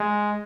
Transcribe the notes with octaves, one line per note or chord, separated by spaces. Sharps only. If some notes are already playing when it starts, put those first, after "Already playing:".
Already playing: G#3